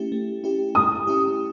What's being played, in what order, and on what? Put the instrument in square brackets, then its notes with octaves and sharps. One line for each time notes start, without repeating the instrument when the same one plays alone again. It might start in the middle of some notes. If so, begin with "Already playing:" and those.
Already playing: [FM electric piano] A3 C#4 E4 G4
A3
C#4 E4 G4
[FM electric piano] A3 [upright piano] D#6
[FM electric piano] C#4 E4 G4